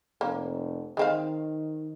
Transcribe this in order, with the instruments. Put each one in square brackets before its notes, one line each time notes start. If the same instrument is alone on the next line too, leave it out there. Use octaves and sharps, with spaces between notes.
[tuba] F1 [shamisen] A#3
[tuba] D#3 [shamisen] G#3 C4 F5